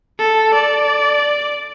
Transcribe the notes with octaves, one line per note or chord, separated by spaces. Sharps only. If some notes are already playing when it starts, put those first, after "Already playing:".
A4
D5